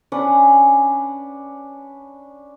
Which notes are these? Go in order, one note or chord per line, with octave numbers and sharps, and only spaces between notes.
C#4 D4 B4 F#5